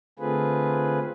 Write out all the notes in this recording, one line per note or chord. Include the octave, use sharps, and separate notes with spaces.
D3 A3 C4 F4 G#4 B4